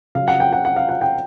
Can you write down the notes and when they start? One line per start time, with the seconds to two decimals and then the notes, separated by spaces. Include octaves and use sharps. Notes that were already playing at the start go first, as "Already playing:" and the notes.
0.15 C#3 F#3 F5
0.28 F#5
0.40 G5
0.53 F#5
0.65 F#5
0.76 F5
0.89 F#5
1.01 G5